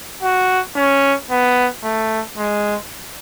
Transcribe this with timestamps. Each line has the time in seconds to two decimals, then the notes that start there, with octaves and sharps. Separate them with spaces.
0.22 F#4
0.76 C#4
1.30 B3
1.84 A3
2.37 G#3